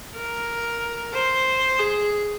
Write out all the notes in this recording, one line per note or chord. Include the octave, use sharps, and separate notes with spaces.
A#4
C5
G#4